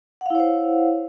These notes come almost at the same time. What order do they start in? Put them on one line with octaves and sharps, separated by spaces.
F#5 F5 E4 C#5 C5